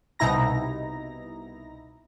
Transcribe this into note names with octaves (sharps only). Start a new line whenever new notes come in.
C2 B2 D#4 E4 A#5 A#6